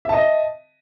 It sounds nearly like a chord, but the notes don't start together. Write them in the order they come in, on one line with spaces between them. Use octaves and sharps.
E5 A5 D#5